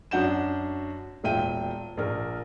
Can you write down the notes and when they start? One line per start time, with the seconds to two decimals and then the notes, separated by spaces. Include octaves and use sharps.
0.11 F#2 D4 F#4 F#5 G6 E7
1.24 E1 A#2 E5 G5 D#7
1.97 A#1 A#4